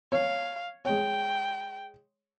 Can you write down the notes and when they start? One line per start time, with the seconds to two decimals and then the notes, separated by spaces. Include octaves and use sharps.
0.12 C#5 F5
0.85 G#3 C#5 G5